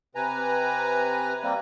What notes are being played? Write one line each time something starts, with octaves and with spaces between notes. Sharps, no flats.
C3 B4 G#5 A#5
G3 A#3 C4